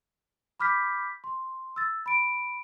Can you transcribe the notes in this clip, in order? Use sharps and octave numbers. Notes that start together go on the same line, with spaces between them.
B5 D6 F6 G6 B6
C6
E6 A6
B5 D7